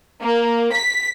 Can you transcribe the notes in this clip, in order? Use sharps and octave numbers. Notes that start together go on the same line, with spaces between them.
A#3
B6